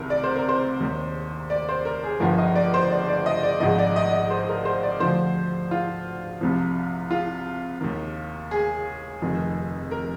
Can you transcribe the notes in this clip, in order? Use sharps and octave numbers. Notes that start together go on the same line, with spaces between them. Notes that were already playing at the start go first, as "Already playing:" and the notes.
Already playing: C2 C3 D#3 A#4
D5
C5
A#4
C5
D#2 D#3
D5
C5
A#4
G#4
G1 G2 D3 F3 A#4
D#5
D5
C5
D5
D5
D#5
D5
G#1 G#2 F3 D#5
D5
D#5
D#5
C5
A#4
C5
D5
D2 D3 F3 C5
F4
C2 C3 F3
F4
D#2 D#3
G#4
F1 F2 D#3
A#4